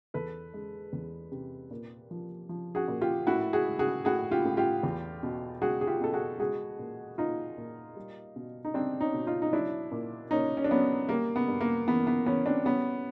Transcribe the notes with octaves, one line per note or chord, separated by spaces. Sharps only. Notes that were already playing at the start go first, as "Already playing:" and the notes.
E2 A4 B4
G#3
E2
C3
A#2
F3
F3
F#4 G#4
A#2
F4 G4
A2 E4 F#4
F#4 G#4
G#3
F#4 G#4
A2 F#4 G#4
F4 G4
A2
F4 G4
E2
B2
G#3 F#4 G#4
G#4
F4 G4
B2 A4
F#4 G#4
G#3 F#4 G#4
A#2
A#2 D#4 F4
A#2
G3
B2
D#4
G3 C4 D4
C#4 D#4
B2
D#4 F4
D#4
F#3 D4 E4
A#2
A#2 C#4 D#4
C#4
D4
F#3 B3 C#4
G3 A#3
B3
G2
A#3
E3 B3
B3
E3 B3 C#4
C4 D4
G3 B3 C#4